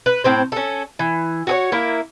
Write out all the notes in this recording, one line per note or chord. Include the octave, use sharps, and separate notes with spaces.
B4
A2 C4 C5
C#4 A4
E3
F#4 G#4 C#5
A#3 E4